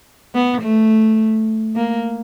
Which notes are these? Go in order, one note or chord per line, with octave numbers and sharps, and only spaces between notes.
B3
A3
A#3